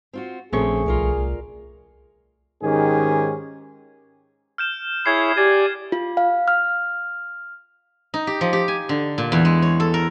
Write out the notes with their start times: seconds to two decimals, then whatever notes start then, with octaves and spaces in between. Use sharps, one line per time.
0.13 C4 F4 F#4
0.53 A#1 D3 A3 C4 C#4 G#4 C#6
0.86 C2 F4 A#4 D5
2.63 G#2 D#3 C#4 G4 G#4
4.58 F6 G6 E7
5.06 E4 G#4 C#5 G#6 C7
5.37 G4 D5 G#5
5.92 F4
6.17 F5
6.48 F6
8.14 D#4
8.27 G4
8.41 F3
8.53 G4
8.68 G#5
8.89 D3
9.18 A#2
9.32 E2
9.45 G#3
9.62 C#5
9.80 A4
9.94 A#4